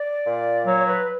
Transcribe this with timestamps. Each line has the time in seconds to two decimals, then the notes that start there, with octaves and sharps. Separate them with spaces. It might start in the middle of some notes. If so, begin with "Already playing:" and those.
Already playing: D5
0.26 A#2
0.66 F#3 C#5
0.87 B4